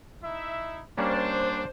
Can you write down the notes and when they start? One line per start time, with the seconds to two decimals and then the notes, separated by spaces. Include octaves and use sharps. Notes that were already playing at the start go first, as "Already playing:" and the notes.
0.22 D#4 E4 E5
0.98 G3 A#3 C#4 D4 C5